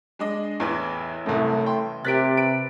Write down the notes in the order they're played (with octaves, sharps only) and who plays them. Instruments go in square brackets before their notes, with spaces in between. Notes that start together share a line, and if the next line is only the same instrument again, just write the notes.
[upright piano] G#3 D4 D#5
[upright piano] A1 E3 B4 [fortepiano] E2
[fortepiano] C2 F#2 [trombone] A3
[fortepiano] G5 C6
[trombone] C3 [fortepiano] G4 A#4 F#6 [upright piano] A6 B6 D7
[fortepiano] B4 [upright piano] D7